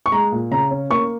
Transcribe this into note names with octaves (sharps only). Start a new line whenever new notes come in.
C#6
G#3 A#5
A#2
C#3 A#5
C#4
A#3 C#6